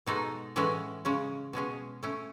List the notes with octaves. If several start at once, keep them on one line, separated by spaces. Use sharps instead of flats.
B2 G#3 D#4 F#4 A4
A2 E3 G#3 C#4 F#4
C#3 G#3 C#4
B2 G#3 C#4 G#4
A3 C#4 E4